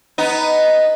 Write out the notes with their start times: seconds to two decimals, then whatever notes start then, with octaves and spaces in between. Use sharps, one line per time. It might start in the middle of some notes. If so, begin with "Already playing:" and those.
0.18 B3 D#4